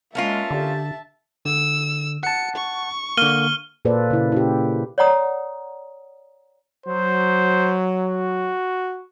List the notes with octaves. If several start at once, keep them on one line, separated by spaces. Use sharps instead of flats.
G#3 A#3 C#4 F4 E5 A5
D3 G4
D3 E6
F#5 A5 C#7
C#6
D3 A#3 F6 D#7 G7
A#2 A#3 A4 B4 C5 D5
C#3 E4
E4 G4
C#5 D5 F#5 A#5 D#6
F#3 C5
F#4